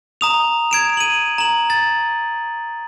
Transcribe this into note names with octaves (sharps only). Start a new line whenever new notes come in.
A#5 D#6 F7
G#6 D7 E7
D#7 F#7
A#5 F#7
A6